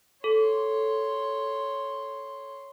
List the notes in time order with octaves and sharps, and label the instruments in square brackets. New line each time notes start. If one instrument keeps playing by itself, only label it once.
[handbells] A4 [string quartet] C#5 C6